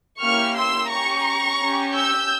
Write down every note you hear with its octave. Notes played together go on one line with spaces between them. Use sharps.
A#3 C#4 E4 G4 C#6 F6
C6 E6
C#4 G4 A#5 C#6
C#4 G4
E6 G6